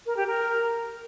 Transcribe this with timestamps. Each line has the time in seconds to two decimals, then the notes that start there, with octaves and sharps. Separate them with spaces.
0.06 A#4
0.17 G4
0.27 A#4